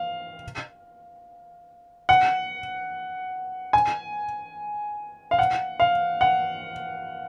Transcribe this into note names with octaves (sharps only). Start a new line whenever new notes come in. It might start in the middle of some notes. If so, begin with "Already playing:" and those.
Already playing: F5
F#5
G#5
F5
F#5
F5
F#5